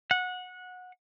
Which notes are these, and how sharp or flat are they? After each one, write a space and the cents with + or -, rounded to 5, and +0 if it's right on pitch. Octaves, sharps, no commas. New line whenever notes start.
F#5 -20